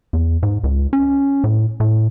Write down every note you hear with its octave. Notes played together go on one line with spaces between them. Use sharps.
E2
G#2
C#2
C#4
A2
A2